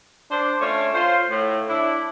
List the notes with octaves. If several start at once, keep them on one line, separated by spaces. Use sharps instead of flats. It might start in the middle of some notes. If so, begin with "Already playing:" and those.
D4 C5
A3 C#4 D4 F4 C#5
F4 C5
A2
D4 E4